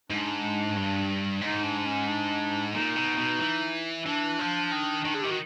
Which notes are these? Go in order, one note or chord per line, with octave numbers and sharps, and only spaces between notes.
G#2 D4
G2
G#2 D#4
D4
C#4
D4
A#2 D#4
B2
B2
E3
E3 D4
F3
D#3
D#3
D3 G#4
D#3 G4
F#4